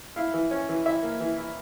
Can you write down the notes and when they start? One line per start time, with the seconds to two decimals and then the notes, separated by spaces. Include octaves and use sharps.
0.16 E4 F5
0.34 E3
0.51 C#4
0.69 E3
0.86 E4 E5
1.03 A#3
1.20 E3
1.38 E4